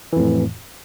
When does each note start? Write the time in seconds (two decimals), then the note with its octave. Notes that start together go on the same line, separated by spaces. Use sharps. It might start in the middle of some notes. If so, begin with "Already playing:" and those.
0.13 E3
0.16 F2
0.20 A2